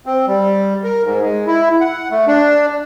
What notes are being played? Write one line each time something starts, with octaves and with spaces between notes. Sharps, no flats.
C4
G3
A#4
G#2
G#3
E4
F#5
A3
D4